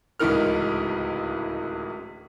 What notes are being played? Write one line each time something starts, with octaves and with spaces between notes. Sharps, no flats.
D1 C#2 E3 D#4 A#4 F6